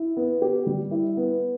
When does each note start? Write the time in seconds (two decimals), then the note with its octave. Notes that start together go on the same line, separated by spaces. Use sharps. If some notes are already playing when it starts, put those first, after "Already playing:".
Already playing: E4
0.17 B3
0.42 G4
0.67 G3
0.91 E4
1.17 B3